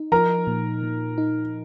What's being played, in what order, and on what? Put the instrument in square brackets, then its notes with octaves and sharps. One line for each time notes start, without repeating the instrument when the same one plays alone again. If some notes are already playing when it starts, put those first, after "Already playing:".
Already playing: [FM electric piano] D#4
[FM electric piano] F3 [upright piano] A#4 A#5
[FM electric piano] A#2
A#2
D#4